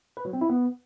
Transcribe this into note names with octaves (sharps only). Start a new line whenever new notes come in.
B4
F#3
C4
E4
B3